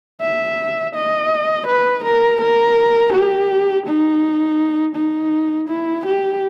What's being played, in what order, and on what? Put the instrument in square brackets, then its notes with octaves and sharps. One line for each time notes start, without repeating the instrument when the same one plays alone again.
[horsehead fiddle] E5
D#5
B4
A#4
A#4
G4
D#4
D#4
E4
G4